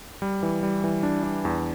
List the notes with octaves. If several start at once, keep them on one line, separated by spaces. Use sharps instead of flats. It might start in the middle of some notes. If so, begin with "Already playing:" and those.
G3
E3
G3
E3
D4
D4
E2